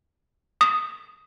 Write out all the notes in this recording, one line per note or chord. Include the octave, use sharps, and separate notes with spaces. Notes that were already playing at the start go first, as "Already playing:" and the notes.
D#6